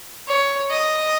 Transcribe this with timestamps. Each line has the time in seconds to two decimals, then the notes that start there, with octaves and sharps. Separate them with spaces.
0.28 C#5
0.71 D#5